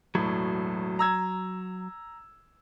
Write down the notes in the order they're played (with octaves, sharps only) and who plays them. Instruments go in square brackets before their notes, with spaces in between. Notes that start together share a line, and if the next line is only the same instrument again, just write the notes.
[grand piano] E1 A2 [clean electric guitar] F#3
[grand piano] A#5 E6 G#6